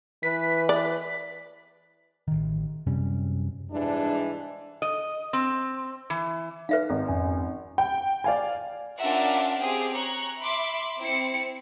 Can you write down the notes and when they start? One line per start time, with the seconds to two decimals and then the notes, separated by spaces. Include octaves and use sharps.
0.23 E3 B4 B6
0.69 D5
2.28 A1 D#3
2.87 F#2 C3 G3 C#4
3.71 G#2 E3 G3 G#3 D4
4.82 D#5
5.33 C4
6.10 E3
6.69 D#4 B4 E5 F5
6.90 G#1
7.08 F2 C#4 G#5
7.78 G5
8.24 D5 F5 G#5
8.99 C#4 D4 F4 A#4 E5 F#5
9.56 C4 G4 G#4
9.94 C#5 A#5 C#6 F#6
10.39 E5 B5 C6 D6
10.99 C4 E4 C#7